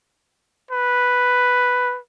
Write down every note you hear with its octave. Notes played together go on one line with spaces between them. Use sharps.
B4